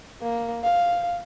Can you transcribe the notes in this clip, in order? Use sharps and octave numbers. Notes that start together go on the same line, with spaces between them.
A#3
F5